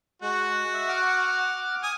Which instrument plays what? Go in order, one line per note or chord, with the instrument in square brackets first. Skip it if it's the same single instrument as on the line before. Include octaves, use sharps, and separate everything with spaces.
[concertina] G#3 F#6 [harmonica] F#4
[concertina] E5
F#5 D6 F6
[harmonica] G#5 D#6